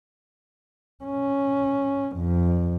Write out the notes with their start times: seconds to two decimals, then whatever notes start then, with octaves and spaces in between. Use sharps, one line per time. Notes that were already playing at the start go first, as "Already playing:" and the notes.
1.04 C#4
2.16 F2